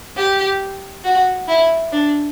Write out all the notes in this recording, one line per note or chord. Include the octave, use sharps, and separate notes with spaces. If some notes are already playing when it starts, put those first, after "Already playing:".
G4
F#4
E4
D4